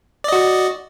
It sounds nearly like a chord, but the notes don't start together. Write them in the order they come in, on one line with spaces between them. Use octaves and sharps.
D5 D#5 F#4